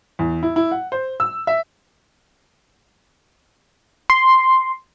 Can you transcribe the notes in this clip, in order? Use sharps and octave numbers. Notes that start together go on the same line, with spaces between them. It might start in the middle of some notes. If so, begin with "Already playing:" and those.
E2
E4
E4
F#5
C5
E6
E5
C6